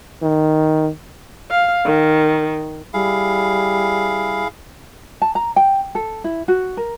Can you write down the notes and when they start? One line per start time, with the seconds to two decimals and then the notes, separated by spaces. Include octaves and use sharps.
0.22 D#3
1.50 F5
1.85 D#3
2.94 G3 E4 G#4 F5
5.22 A5
5.35 A#5
5.56 G5
5.95 A4
6.24 E4
6.48 F#4
6.77 A#4